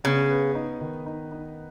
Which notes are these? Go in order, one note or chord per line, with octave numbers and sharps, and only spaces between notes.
C#3 B3
B4
D#4
D#3
D#4
D#4